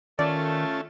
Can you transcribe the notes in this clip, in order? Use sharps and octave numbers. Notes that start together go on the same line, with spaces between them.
D#3 A3 C#4 F4 D5 A5